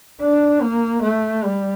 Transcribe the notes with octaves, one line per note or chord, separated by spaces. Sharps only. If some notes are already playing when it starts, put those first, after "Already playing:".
D4
A#3
A3
G3